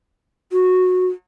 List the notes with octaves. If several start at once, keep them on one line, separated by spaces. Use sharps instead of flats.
F#4